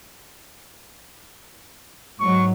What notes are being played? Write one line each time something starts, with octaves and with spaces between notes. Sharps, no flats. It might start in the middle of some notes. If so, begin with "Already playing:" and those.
G#2 F#3 C#6